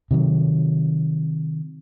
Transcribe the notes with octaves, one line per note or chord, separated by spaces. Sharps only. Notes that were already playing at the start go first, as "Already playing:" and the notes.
C3 D#3 F#3